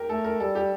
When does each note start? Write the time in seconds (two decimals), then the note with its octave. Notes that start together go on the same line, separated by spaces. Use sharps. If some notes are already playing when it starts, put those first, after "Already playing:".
Already playing: G4 A#4
0.09 A3 A4
0.24 A#4
0.40 G3 A4
0.55 G4